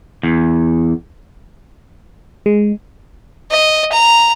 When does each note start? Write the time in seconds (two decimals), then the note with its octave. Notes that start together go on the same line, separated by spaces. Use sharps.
0.23 E2
2.46 G#3
3.51 D#5
3.92 A#5